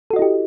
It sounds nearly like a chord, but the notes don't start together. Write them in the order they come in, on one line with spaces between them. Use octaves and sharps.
A4 F#4 D#5 E4 G4